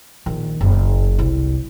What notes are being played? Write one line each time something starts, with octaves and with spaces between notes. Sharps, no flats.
A#1 D#3
F#1
C2